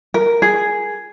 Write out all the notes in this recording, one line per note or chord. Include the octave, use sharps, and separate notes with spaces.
A#4
G#4